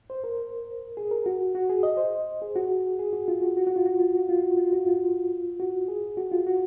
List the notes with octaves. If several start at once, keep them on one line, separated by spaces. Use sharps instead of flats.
C5
A#4
G#4
A#4
F#4
F#4
G#4
D#5
C5
G#4
F#4
G#4
F#4
F4
F#4
F#4
F#4
F4
F#4
F4
F#4
F4
F#4
F4
F#4
F4
F#4
G#4
F#4
F4
F#4